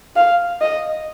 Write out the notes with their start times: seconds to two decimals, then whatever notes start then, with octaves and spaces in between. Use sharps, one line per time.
0.16 F5
0.61 D#5